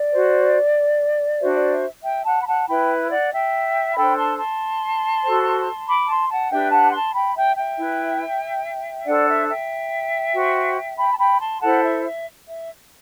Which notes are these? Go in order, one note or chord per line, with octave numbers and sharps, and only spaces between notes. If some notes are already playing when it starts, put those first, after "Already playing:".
Already playing: D5
F#4 C5
D4 F#4 C5 E5
D5
E5
E5 G5
F#5 A5
B5
F#5 A5
E4 B4 G5 B5
D5 F#5
E5 G5
D4 A4 C5 G5 B5
A5 C6
A5 C6
F#4 A4 C5
B5 D6
A5 C6
F#5 A5
D4 G4 B4 E5 G5
F#5 A5
A5 C6
G5 B5
E5 G5
E5 G5
E4 B4
D4 A4 C5 D5 F#5
E5
E5 G5
F#4 C5
G5 B5
A5
G5 B5
A5 C6
E4 A4 C5 F#5 A5
E5
E5
E5